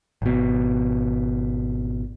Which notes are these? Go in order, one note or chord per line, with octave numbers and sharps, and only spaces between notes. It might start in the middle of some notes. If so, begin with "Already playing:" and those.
G#1 B2